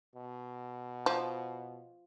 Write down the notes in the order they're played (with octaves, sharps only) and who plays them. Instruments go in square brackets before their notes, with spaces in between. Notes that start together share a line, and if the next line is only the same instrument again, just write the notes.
[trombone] B2
[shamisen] F3